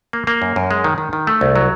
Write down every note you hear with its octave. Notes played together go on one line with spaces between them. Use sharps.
A#3
A#3
F#2
F#2
G#3
D#3
D#3
D#3
A3
C2
F#3